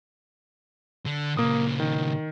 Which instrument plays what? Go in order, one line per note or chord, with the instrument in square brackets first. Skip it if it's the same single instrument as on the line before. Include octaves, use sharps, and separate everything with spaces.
[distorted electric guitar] D3
[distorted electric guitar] A#2 C#3 [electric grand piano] A#3 D#6
[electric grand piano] D#3